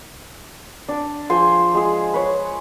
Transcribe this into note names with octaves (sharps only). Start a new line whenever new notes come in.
D4 D6
F3 G#4 C5 G#5
G#3 G#4
B4 C#5